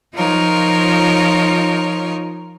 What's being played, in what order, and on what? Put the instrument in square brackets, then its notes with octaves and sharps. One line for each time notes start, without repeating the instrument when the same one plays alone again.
[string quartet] F3 D#4 F4 A#4 C#5